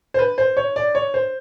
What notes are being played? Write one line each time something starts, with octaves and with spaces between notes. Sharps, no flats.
C5
B4
C5
C#5
D5
C#5
C5